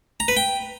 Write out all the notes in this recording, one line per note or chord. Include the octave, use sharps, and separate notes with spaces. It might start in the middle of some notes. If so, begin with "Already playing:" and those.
A#5
B4
G5